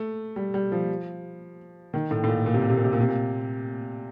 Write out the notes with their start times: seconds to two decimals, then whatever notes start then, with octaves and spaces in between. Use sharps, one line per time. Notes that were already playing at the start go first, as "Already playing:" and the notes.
Already playing: A3
0.36 G3
0.54 G3
0.72 F3
1.94 D#3
2.11 A2
2.24 A2
2.28 A#2
2.46 A#2
2.54 C3
2.62 A#2
2.70 C3
2.77 A#2
2.85 C3
2.93 A#2
3.01 C3
3.08 A#2